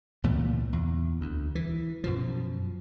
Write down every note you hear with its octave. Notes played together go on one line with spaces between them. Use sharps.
C#2 A#2 E3 A3
E2
D2
E3
F#2 B2 F3